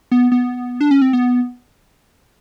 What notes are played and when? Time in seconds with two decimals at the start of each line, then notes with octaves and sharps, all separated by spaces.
0.11 B3
0.32 B3
0.81 D4
0.91 C#4
1.02 C4
1.13 B3